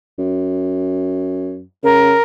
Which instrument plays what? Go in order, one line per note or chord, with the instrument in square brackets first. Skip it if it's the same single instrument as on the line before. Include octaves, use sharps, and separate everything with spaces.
[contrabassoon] F#2
[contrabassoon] C#3 [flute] A#4